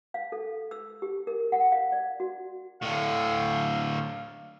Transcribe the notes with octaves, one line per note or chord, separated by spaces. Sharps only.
F5
A4
E6
G4
A#4
F#5
F5
D5
F#4
A2 D3 F5